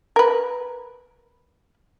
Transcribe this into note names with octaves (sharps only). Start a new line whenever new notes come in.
A#4 B4